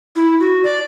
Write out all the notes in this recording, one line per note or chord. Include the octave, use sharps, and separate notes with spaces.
E4
F#4
D5